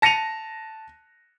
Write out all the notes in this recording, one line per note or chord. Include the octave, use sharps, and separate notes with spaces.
A5 A#6 C#7 D#7 F7